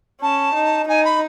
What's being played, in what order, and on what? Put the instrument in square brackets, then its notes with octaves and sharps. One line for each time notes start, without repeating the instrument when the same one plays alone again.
[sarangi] C#4 [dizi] A5
[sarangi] D#4
[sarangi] D#4 [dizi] G#5
[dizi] B5